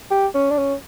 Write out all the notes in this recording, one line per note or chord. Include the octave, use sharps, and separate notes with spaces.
G4
C#4
D4
C#4